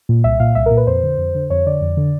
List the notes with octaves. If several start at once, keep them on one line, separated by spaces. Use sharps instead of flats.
A#2
C2 E5
A#2 F5
C2 E5
A#4
A#2
B4
F2 C5
D3
F2
D3
F2 C#5
D3 D5
F2
D3